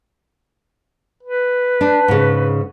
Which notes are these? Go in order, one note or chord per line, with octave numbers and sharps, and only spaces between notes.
B4
D4
G#2 C#3